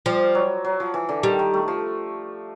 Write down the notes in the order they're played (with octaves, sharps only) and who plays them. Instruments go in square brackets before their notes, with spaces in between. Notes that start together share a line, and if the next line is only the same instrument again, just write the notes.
[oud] F3 [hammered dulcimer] G3
[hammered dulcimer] F#3
F#3
F3
E3
D3
[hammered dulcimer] D#3 [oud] G3
[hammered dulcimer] D#3
A3
F3